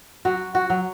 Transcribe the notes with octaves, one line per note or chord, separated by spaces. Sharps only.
F#3 F#4
F#4
F#3